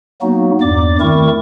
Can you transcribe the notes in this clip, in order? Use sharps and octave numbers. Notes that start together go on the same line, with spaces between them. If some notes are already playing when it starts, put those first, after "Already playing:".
F#3 A#3 B3 D#4 F#4
E2 G2 D5 D6
D#3 A3 C4 E4 A#4 C#6